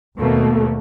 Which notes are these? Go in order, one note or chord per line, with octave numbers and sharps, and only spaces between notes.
D#2 B2 A3 A#3